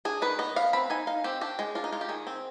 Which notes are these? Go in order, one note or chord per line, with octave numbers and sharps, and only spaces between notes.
D4 G#4
D#3 B4
B3 D#5
B3 F5
C4 B5
D#4 G#5
D#4 F5
C4 G4
D4 G4
G#3
D4 F4
D#4
G#3 F4
G4
D#3 G#4
C4